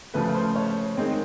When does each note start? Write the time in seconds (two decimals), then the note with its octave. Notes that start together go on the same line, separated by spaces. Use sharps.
0.14 D2 C#3 F3 A3 B4
0.34 C5
0.56 C#5
0.97 D#3 G#3 C4